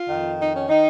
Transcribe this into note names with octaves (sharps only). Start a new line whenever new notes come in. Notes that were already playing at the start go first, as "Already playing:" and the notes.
Already playing: F4
F2 D#3
D#4
C#4
D#3 D#4